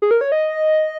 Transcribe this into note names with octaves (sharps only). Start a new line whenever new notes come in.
G#4
A#4
C#5
D#5